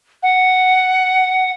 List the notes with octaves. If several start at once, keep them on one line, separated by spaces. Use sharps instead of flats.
F#5